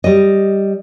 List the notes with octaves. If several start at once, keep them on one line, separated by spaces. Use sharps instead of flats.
G3 D#5